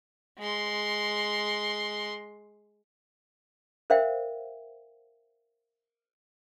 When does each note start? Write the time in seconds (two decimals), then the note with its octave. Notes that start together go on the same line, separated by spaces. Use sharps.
0.39 G#3 C6
3.90 A#4 C5 E5 F5 G5